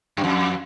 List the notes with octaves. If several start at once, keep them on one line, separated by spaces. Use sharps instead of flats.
F#2
F2